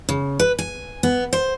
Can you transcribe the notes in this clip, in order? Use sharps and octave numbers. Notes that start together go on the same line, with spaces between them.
C#3
B4
G#5
B3
C5